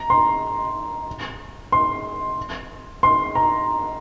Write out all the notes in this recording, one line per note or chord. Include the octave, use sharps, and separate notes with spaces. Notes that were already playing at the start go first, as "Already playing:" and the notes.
Already playing: A#5
C6
C6
C6
A#5